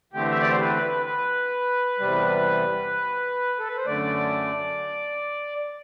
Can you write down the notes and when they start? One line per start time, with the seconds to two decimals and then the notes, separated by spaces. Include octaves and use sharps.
0.13 E2 D3 A3 C4 G4
0.31 E5
0.41 D5
0.50 C5
0.60 B4
1.06 B4
1.99 E2 C3 G3
3.59 A4
3.68 B4
3.77 C5
3.86 F#2 D3 A3 D5